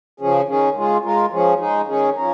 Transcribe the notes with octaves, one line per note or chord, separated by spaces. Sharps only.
C#3 F3 C#4 G#4
D#3 C#4 G#4
G#3 F4 G#4
G#3 F4 A#4
F3 C#4 G#4
G#3 D#4 G#4
D#3 C#4 G#4
F3 C#4 A#4